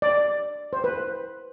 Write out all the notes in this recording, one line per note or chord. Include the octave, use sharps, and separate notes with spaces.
D5
C5
B4